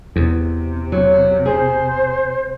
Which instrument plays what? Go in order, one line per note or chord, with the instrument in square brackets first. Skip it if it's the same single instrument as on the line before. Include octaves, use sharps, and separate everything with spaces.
[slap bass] E2 [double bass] C3
[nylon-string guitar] F#3
[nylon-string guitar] G#4 [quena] C5